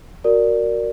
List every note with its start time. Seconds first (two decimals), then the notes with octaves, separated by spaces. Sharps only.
0.24 F#4 A#4 D5